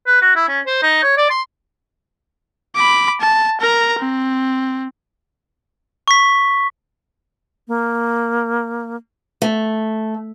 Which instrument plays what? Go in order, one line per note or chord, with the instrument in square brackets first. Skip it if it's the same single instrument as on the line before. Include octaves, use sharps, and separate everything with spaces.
[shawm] B4
F#4
E4
C#4
C5
D#4
C#5
D5
C6
[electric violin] B5 D6
A5
A#4 A#5
C4
[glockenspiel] C#6 B6
[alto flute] A#3
[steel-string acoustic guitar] A3